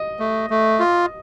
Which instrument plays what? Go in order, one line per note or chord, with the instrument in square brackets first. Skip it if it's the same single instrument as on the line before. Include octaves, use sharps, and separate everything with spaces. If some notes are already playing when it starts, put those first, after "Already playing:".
Already playing: [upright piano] D#5
[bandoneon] A3
A3
F4